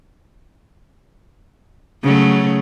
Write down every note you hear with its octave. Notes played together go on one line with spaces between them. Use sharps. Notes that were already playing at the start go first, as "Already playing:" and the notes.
C#3 F#3 A3